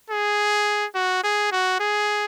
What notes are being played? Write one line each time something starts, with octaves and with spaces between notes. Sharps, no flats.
G#4
F#4
G#4
F#4
G#4